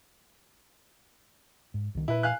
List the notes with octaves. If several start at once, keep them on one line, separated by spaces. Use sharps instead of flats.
G#2
C2 D#3
A#2 E4 B4
F5 G#5 F#6